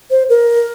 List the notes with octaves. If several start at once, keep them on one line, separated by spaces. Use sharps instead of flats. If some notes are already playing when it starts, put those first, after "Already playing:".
C5
A#4